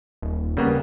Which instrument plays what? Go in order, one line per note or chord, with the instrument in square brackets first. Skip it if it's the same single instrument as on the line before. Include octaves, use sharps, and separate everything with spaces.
[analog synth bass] D#1
[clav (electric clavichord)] C#3 A#3 B3 [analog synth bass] G3